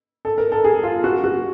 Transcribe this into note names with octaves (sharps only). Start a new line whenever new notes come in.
A4
A#4
A4
G#4
F4
F#4
F#4